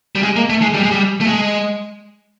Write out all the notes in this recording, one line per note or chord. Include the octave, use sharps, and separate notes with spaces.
G3
G#3
A#3
A3
G#3
G3
G#3
G3
A3
G#3